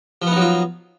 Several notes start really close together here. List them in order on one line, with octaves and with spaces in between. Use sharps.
F3 B3 D#4 F#3 F4